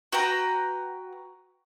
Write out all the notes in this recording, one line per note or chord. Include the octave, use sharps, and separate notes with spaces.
F#4 B4 G5 A#5